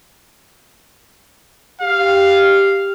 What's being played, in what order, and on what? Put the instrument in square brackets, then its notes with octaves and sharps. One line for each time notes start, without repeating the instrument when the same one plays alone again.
[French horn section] G4 [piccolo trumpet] F5